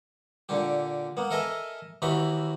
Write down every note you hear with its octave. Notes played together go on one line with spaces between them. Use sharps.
A#2 D3 G4
A#3 B3
A4 A#4 D#5 E5 G#5
D#2 E3 D#4 F#4 B5